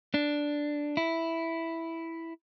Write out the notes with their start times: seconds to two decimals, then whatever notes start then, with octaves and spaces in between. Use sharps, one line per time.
0.14 D4
0.97 E4